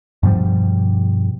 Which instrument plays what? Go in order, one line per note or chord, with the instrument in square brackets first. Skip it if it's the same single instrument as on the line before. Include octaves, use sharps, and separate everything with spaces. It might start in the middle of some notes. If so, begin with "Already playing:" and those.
[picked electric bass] G2 B2 F3 G3